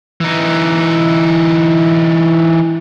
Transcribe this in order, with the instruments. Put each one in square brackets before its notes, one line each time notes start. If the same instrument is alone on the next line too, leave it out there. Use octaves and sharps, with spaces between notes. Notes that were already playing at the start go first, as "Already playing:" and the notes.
[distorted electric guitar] E3 D#4